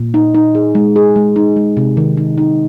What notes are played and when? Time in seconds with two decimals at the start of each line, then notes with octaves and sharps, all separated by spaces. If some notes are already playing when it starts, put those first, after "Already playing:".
Already playing: A#2
0.14 D#4
0.34 D#4
0.55 G#4
0.75 G#3
0.96 G#4
1.16 G#3
1.36 D#4
1.57 G#3
1.77 C3
1.97 D#3
2.17 D#4
2.38 D#4